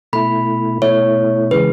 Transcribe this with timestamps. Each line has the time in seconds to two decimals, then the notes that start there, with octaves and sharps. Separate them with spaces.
0.13 B2 A3 E4 B5
0.82 B2 A3 E4 C#5
1.51 C#3 E3 G#3 B4